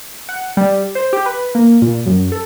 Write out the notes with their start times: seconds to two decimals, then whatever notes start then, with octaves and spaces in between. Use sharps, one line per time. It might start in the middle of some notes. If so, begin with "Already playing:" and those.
0.29 F#5
0.57 G3
0.95 C5
1.13 G4
1.26 B4
1.55 A#3
1.82 A#2
2.06 F#2
2.32 A4